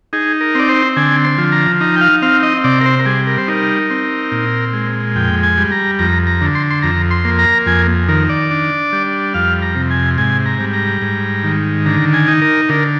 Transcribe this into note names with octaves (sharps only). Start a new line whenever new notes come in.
D#4 G#4
A#4
C4 D5
C5
D3 G#5
C6
F3
A#5
D#4 A#5
G5
F5
C4 F5
D#5
C3 D5
A#4
C5
A#4
G3 G#4
A#4
C5
D#4 A#4
C4
A#2
G#3
F2 G5
G#5
G3
A#5
F2 A#5
A#5
D3
C6
C6
F2 A#5
C6
A#3
A#5
F2 G#5
D#3 A#4
D5
D4
G3
F2 F5
A#5
C3
G#5
G#2 G#5
A#5
G3
A#5
G#2
D#3
D3 A#5
G#5
D#4
A#4
D3 A#4